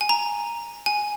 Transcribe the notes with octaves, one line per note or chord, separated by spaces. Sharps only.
G#5
A#5
G#5